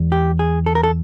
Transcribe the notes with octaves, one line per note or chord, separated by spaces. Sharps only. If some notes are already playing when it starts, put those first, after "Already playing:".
Already playing: E2 G#3
G4
G#4
A4
A#4
A4